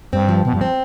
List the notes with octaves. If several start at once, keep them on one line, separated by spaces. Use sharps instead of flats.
G2 C4
F3
B2 F3
G2
C4